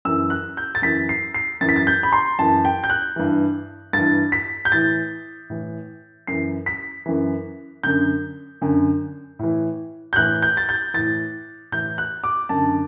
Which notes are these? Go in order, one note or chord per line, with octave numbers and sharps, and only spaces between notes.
F#2 E3 E6
F#6
G6
A6
F#2 E3 B6
C7
C7
F#2 E3 A6
B6
A6
G6
B5
C6
F#2 E3 A5
G5
G6
F#6
G2 E3
G2 E3 A6
B6
G6
A2 E3 A6
A2 E3
F#2 E3 C7
B6
F#2 E3
F#2 D3 G6
F#2 D3
A2 E3
G6
A2 E3 F#6
G6
A6
G6
A2 E3 A6
A2 E3 G6
F#6
D6
F#2 D3 A5